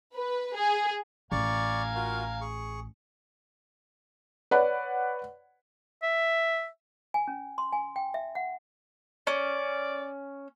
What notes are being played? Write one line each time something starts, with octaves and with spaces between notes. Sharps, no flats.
B4
G#4
A1 D5 F5 G#5 A#5 C#6
F4 F#4 A#4
G#4 C#6
B4 C#5 D5 F#5 B5
E5
G#5
C#4
C6
G#5
G5
E5
F#5
C#4 D5